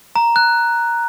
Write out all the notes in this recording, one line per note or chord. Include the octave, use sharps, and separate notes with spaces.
A#5
F#6